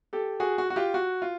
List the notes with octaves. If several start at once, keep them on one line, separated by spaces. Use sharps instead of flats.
G4 A4
F#4 G#4
F#4
F#4
F4 G4
F#4
F4